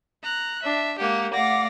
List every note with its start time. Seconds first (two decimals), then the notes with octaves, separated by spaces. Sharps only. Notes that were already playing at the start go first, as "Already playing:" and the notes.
0.23 A#5 F#6
0.63 D4 E5
0.99 G#3 A#3 G4 F#5
1.33 A3 D5 F5 F#5 D6 A#6